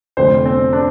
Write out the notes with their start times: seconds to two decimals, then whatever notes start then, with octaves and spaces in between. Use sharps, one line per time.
0.17 F1 F2 D3 C5
0.45 C4
0.73 D4